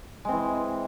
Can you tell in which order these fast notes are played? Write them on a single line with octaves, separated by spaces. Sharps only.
G#3 C4 E3